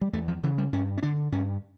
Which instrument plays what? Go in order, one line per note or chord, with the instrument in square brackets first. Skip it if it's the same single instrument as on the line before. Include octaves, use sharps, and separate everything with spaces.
[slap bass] G3
E2 A3
F3
C#3 E3
G3
G2 C#4
C#4
D3 D4
G2 C#4